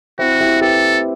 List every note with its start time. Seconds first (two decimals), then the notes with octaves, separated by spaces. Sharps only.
0.19 C4 E4 F#4
0.40 E4 G4
0.61 G4 A4 B4